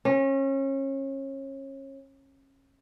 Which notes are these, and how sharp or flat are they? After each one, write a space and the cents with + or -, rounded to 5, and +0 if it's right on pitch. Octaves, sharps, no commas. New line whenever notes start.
C#4 -30